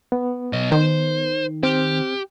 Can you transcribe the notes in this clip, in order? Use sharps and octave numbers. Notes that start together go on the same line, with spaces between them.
B3
B1 D#5
D#3 C5
C4 G4 F6